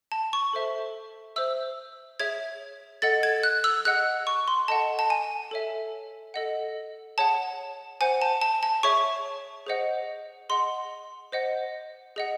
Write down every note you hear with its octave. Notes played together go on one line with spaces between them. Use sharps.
A5
C#6
A4 C5 E5
C5 E5 E6
G#4 C#5 E5 G#6
A4 D#5 F#5 A6
G#6
F#6
E6
G#4 D#5 F#5 F#6
C#6
C6
A4 D#5 F#5 A5
A5
G#5
A4 C#5 E5
A4 D#5 F#5
G#4 C#5 F#5 A5
C5 F#5 G#5
A5
A5
A5
G#4 C#5 E5 C#6
G#4 C5 D#5 F#5
G#4 D#5 F#5 C6
C5 D#5 F#5
G#4 D#5 F#5